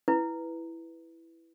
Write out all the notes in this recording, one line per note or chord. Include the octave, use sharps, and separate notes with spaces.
E4 B4